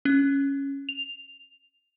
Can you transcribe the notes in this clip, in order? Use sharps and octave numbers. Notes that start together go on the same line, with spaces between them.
C#4
F7